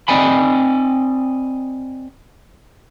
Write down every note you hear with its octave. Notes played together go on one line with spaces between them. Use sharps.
C4 D5 D#5 G#5 B5